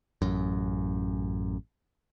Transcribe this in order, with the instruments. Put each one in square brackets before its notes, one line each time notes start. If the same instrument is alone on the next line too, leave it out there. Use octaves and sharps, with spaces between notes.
[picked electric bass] A1 F#2